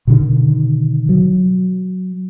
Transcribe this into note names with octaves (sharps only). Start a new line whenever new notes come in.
B2 D3 D#3
F#3